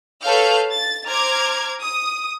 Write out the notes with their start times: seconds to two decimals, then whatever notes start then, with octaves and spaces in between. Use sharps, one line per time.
0.24 A4 B4 C#5 F5 F6 G6
0.72 A6
1.07 C5 A#5 D6 F6 G#6
1.83 D#6